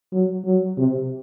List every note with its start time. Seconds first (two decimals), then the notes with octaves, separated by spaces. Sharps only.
0.13 F#3
0.45 F#3
0.77 C3